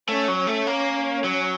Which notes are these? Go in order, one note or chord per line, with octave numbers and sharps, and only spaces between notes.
A3 C#4
F#3
C#4
A3
A#3
F#3